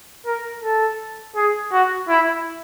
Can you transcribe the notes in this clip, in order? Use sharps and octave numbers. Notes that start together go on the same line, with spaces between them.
A#4
A4
G#4
F#4
E4